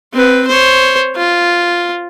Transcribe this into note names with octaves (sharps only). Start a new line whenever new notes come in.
C4 B4
C5 C#5
F4